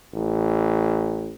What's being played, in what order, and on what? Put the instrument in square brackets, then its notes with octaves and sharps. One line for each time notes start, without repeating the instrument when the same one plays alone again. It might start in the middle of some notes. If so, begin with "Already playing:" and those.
[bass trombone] A1